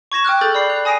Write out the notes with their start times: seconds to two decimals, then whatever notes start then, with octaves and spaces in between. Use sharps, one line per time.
0.12 C#6 G#6 A#6 E7
0.24 G5 D6 F6 F#6
0.41 G#4 A4 D6 G6 A6
0.54 D5 B5 C7
0.69 F#6 F7
0.85 G#5 D#6 A#6 C7 D7 D#7